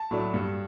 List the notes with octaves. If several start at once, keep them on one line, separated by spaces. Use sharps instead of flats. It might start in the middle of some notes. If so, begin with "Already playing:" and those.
Already playing: A5
A2 F#3 A3 D4
G2